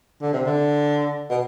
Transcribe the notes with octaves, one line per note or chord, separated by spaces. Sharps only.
D3
C3
D3
B2